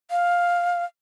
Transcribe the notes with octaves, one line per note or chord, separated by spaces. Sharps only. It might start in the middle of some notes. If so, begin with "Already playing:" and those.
F5